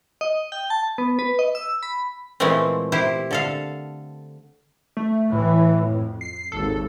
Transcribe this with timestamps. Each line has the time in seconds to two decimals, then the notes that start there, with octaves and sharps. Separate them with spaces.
0.21 D#5
0.52 G5
0.70 A5
0.98 B3
1.19 B4
1.39 D#5
1.55 E6
1.83 B5
2.40 A#2 E3 F3 G#3 A3 C4
2.92 E4 G4 C5
3.31 D3 A4 F5
4.97 A3
5.32 A2 E3
5.85 F2
6.21 C7
6.52 G#1 D#2 A4